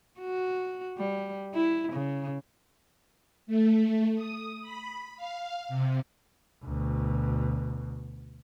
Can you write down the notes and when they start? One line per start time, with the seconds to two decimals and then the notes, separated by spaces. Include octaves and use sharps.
0.20 F#4
0.98 G3
1.54 E4
1.92 C#3
3.47 A3
4.15 D#6
4.61 B5
5.17 F5
5.69 C3
6.64 D2 B2